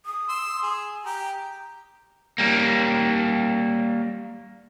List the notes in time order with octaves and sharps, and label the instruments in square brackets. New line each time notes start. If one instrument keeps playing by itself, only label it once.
[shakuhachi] D#6
[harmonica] C6 E6
G#4
[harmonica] G4 [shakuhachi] A#5
[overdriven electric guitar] G3 A#3